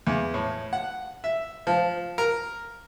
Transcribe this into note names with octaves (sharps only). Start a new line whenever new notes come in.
E2
A2
F#5
E5
F3
A#4